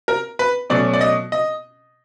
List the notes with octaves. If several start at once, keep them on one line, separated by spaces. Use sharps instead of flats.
A#4
B4
B2 F#3 A3 C#4 D5
D5
D#5
D#5